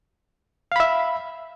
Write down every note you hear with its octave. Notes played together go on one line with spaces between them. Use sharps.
E5 F5 B5